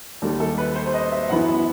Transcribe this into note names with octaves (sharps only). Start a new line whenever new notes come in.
D#2 D#3 G3 A4
A4
B4
C5
C5
D#5
E5
F#2 E3 B3 E4 F#5
E5